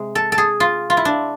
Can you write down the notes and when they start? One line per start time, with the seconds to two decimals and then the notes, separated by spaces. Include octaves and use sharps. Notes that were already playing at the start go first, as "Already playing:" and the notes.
Already playing: C3 G#3
0.15 A4
0.32 A4
0.38 G#4
0.60 F4
0.90 F4
0.97 E4
1.05 D4